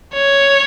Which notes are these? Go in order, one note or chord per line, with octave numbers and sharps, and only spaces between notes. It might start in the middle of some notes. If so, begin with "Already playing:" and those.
C#5